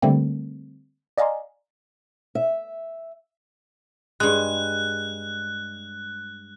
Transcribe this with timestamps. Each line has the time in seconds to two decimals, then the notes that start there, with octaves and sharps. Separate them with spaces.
0.02 D3 G3 A3 A#3 C4
1.18 D5 D#5 F5 G#5 A#5 C6
2.35 E5
4.20 G2 G#3 F#6